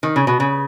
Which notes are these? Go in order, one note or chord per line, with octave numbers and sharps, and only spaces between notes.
D#3
C#3
B2
C#3